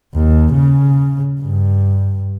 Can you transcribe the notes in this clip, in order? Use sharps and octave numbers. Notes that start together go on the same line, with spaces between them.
D#2
C#3
G2